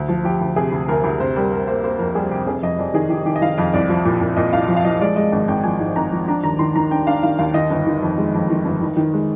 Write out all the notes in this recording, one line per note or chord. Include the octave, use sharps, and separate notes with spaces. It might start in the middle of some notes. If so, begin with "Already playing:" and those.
Already playing: D2
F3
F3 G4
D2
C3 G#4
D2
D2 A#4
D2
C3 C5
G3 A#4
G3 A#4
A#3 C5
A#3 C5
F2 A#4
G3 G#4
C3 G4
F1 G#4
F2 D#5
F2 D5
D#3 G#4
D#3 G4
D#3 G4
D#5
D#3 F5
F2 D#5
C2 D5
F3
A#2
A#2
A#2 D#5
C2 F5
F3
F5
F3 D#5
G#3 D5
G#3 D#5
G#1
G#1 G5
F3 G#5
G#2
G#1 A#5
F3
D4 A#5
D#2 A#5
D#3 C6
D#3 A#5
D4 G5
D4 F5
D#3 F5
D#2 F5
D#3 D#5
G1
D#3
F2
G#3
F2
D#3
G1
D#3
D#3
G#3